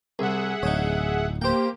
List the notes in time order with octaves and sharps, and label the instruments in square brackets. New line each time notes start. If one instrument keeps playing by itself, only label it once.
[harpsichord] C2 [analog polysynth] G#4 E5 F#5
[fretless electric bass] D1 [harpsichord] D#4 C#5
[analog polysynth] A#3 G4 [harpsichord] C5 G5